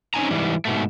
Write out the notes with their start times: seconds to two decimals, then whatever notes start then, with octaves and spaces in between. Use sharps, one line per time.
0.14 C4 C#4 D#4 G#5 A#5
0.30 G#2 E3 G3
0.65 G#2 B2 A3